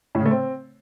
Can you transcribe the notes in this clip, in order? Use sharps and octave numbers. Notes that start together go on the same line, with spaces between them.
A2
C#3
A3
C4